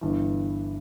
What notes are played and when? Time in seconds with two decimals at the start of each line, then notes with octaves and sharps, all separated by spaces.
0.01 G1 G2 E3